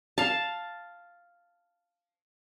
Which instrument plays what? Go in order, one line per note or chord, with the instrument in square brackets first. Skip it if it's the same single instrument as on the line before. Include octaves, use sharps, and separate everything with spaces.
[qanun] F5 A5